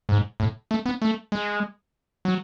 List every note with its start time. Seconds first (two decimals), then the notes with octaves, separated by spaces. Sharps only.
0.09 G#2
0.40 A2
0.71 A3
0.86 B3
1.02 A3
1.32 G#3
2.25 F#3